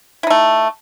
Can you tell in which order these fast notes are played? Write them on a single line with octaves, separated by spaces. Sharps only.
E4 D#4 A3